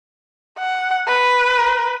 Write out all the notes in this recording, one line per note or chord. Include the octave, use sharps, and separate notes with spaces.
F#5
B4